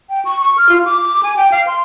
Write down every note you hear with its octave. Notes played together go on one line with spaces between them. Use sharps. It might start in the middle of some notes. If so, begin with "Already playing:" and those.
G5
C#6
C#6
F6
F4
D6
G#5
G5
F5
C6